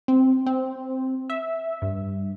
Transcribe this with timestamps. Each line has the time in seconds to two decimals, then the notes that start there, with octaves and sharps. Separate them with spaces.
0.08 C4
0.46 C4
1.30 E5
1.82 G2